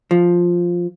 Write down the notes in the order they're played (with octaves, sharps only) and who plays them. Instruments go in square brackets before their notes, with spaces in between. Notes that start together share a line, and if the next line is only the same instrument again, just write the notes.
[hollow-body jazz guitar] F3